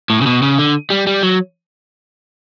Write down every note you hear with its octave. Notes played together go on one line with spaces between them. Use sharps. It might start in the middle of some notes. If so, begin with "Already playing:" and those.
A2
C#3
B2
C#3
D3
G3
G3
F#3